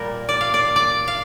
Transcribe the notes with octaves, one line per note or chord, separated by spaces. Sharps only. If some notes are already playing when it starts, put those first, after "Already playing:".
Already playing: A#2 G3 A#4
D5
F5
D5
D5
F5